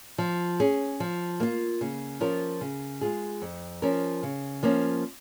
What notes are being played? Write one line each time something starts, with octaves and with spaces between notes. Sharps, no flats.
F3
C#4 G#4
F3
A#3 F4
C#3
F3 C#4 F4 A#4
C#3
G#3 F4 G#4
F2
F3 C#4 A#4
C#3
F3 A#3 C#4